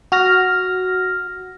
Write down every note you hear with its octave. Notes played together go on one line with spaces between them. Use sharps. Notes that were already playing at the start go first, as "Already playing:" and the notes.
F#4 F6 A#6